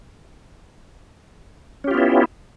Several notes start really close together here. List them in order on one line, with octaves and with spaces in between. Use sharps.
C#4 G4 F4 B3 E4